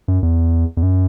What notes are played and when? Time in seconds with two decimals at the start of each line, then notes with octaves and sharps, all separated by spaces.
0.08 F#2
0.23 E2
0.77 E2
0.83 F#2